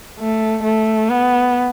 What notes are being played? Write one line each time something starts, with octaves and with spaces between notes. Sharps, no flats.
A3
A3
B3